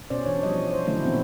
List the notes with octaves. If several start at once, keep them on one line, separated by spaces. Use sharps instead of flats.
B2 C#4 C5 D5
E3 D4 C#5
F3 G3 C#5 D#5
C5
D3 D#3 F#3 A3 C#4 E4
A#2 E3 B3 C4